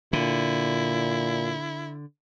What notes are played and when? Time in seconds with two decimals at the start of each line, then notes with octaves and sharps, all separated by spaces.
0.13 A#2 D3 E4